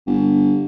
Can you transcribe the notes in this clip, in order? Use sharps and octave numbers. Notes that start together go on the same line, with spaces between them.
G1